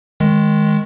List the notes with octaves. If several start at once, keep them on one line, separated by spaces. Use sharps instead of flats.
D#3 G#3